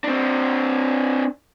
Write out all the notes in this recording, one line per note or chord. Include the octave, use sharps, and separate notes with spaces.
C4 D4